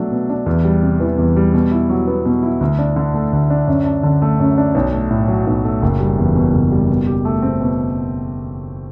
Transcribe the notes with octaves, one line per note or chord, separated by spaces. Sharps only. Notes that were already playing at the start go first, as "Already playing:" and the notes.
Already playing: B2 F#3 A3 D4
B2
D4
E2
G3
C3
E3
E2
G3
B2
E4
F#3
B3
B2
E4
D2
D4
D3
A3
D2
D4
F#2
D4
D3
A3
F#2
D4
B1
A3
A2
F#3
B1
A3
F#1
G3
E2
B2
F#1
G3
B2
G4
A3
C4
B2